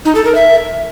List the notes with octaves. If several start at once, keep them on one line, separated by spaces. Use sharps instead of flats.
D#4
A4
A#4
E5